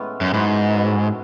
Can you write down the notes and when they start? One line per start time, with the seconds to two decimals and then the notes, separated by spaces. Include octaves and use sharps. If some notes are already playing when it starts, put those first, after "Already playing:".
Already playing: A2 E3 G#3 B3 C#4
0.21 F#2
0.34 G#2 E3 B3 F#4
0.74 A2 F#3 B3